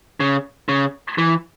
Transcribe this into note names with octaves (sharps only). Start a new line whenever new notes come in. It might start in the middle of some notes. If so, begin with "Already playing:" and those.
C#3
C#3
E3